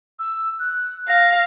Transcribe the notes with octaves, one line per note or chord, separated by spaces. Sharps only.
E6
F#6
F5 A#6